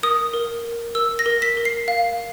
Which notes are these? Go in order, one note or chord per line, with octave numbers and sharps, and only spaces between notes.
A#4 D#6
A#4
A#4
A#4 E6
A#6
A#4
B6
A#4
C7
F5